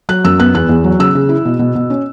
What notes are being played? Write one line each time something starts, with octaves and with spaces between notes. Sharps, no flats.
F#3 F#6
F#2 E6
B3 F#6
E2 F#6
E2
F#3
C#3 E6
C#3
E4
B2
B2
B2
C#4